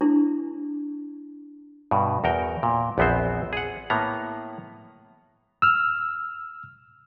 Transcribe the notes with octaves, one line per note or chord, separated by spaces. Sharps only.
D4 E4
G2 B2
E2 F#4 A#4 G5
A#2
A#1 E2 B3 C4 C5
G#4 F#5
A2 A#3 B3 A#5
E6 F6